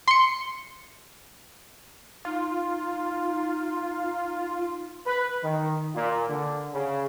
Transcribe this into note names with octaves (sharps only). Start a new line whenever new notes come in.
C6 C#7
D#4 F4
B4
D#3
A#2
D3
C#3